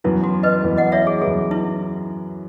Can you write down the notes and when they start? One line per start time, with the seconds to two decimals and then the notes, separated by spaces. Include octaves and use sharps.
0.04 F#2 E3 B3 E4
0.24 F#4
0.43 B4 D#5
0.63 F#2 E3 B3
0.77 D#5 F#5
0.92 C#5 E5
1.07 G#4
1.21 F#2 E3 B3 G#4
1.51 E4